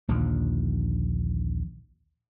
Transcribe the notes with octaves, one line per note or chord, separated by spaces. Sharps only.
A#1 D#2 D3 F3